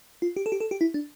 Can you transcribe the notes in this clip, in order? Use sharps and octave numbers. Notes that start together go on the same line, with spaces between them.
F4
G4
A4
G4
A4
G4
E4
D4